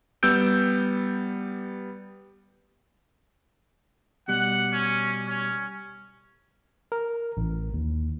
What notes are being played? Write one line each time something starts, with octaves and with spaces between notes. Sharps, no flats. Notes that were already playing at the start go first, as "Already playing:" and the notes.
G3 B3 E6 G6 D7
B2 G3 F#5
C#4
C#4
A#4
A1
D#2